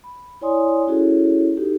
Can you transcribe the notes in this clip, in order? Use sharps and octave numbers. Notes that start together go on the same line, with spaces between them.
B5
E4 C#5 D5 G#5 C6 D#6
C#4 E4 F#4 G#4 A4 C#5
D#4 F#4 G4 A4